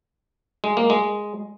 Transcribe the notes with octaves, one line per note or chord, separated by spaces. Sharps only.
G#3
A#3
G#3